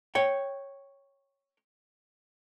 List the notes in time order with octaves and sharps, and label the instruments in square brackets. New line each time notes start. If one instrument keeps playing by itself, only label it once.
[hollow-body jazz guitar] C#5 G5